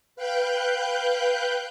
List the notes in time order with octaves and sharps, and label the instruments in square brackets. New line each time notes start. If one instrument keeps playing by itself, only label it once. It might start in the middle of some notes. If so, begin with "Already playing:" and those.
[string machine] B4 F5 G5 F#6 G6